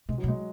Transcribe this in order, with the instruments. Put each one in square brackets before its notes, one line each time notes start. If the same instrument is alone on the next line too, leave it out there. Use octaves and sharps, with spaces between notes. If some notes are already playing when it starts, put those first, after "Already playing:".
[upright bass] B2 [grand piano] G#3
[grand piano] F#3
[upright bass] B2
[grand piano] G#3